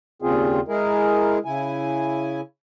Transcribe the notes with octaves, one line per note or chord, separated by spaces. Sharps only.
D#2 A#2 C#3 C4 F4 G#4
G#3 E4 G#4 A#4
C#3 E4 G#5